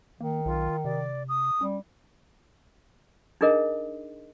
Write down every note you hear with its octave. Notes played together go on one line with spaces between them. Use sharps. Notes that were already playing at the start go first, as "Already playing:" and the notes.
D#3 A#3
B1 F4
C3 D5
D#6
G3 C#4
D4 D#4 G#4 A#4 D#5